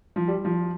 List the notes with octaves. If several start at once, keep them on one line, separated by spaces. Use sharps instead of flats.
F3
G3
F3